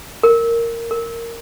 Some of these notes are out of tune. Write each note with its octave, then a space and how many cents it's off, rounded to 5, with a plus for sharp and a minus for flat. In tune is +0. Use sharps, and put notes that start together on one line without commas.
A#4 -10
A#4 -10